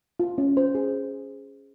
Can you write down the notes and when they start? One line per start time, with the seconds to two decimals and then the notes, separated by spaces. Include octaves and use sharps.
0.20 F4
0.38 C#4
0.57 C5
0.75 G#4